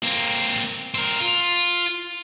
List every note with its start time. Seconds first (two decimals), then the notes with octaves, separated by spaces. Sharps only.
0.03 A#3 C4
0.95 C4 A#4
1.20 F4